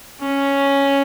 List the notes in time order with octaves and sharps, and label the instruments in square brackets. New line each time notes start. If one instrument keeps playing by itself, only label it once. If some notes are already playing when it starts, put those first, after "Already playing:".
[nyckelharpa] C#4